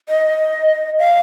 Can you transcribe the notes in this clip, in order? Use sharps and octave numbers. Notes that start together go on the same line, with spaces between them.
D#5
F5